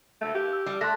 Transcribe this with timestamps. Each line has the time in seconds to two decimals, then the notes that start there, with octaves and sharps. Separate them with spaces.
0.21 A3 E6
0.35 G4
0.53 E6
0.66 G3
0.81 A3 C6 F#6 A#6